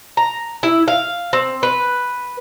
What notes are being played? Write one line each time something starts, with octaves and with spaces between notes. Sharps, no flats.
A#5
E4
F5
C4
B4